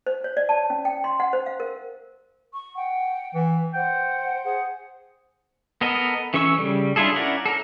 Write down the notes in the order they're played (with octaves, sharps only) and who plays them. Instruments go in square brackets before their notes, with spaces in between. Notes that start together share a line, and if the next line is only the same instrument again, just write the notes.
[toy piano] C5
C#5
D5
A5
C#4
G5
C6
F#5
C5
F5
A#4
[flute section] C#6
F#5 G5
[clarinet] E3
[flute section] C5 F#5 [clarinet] G5
[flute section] G#4 C5 F#5
[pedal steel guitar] B3 A4 A#4 D#5
E3 C#4 A4 C#6 E6
C#3 G3
D4 E4 F4 G#4 A4
C#4 E4 A#4 D5 F#5
A4 A#4